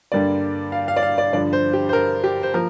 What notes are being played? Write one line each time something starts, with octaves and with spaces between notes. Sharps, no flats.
G2 D3 G3 A#3 D5
F5
F5
D5
F5
D5
G2 D3 F3 D5
C5
G4
C5
A#4
G4
C5
F3 A#3 A#4